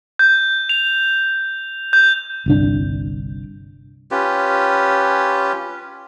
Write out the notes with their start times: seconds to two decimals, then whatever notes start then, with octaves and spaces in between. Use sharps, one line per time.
0.19 G6
0.69 F7
1.93 G6
2.46 G1 C2 D4
4.11 C#4 F4 G4 B4